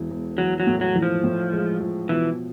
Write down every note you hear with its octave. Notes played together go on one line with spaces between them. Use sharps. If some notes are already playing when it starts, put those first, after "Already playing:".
Already playing: E1 E3
E1
E3 F#3
F#3
A2
F#3
E3
F3
A2
G#3
F3
B2 E3